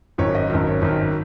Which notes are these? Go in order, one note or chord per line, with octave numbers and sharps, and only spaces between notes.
G#1 F#2 D#3 C#5
D#5
G#1 F#2 D#3
C#5
G#1 F#2 D#3